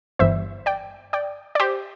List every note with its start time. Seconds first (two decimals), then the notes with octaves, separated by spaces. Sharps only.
0.19 G1 G2 E3 G3 C5 E5
0.66 D5 G5
1.13 D5 G5
1.55 D5
1.60 G4 C5